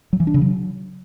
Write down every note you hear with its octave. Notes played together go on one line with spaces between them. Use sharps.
F#3
E3
D4
C#3
F#3